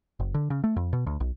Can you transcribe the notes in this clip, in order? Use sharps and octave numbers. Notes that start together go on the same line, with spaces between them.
F#1
D3
C#3
A3
F2
B2
D2
B1